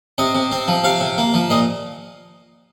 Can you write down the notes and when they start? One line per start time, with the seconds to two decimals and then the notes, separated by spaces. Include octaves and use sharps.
0.18 C3 D#5
0.35 C3
0.52 C4
0.68 F3
0.84 C3 F5
1.00 C3
1.18 A#3
1.34 F3
1.50 A#2 D#5